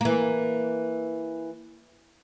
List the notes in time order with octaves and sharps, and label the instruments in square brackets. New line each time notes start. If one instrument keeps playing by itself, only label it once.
[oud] E3 A#3